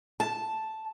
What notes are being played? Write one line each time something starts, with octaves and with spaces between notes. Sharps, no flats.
A5